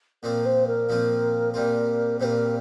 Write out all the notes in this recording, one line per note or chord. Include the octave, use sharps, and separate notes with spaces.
A#2 F3 C4 F4 A#4
C5
A#4
A#2 F3 C4 F4
A#2 G3 C4 F4 A#4
A#2 G3 C4 F4 A#4 C5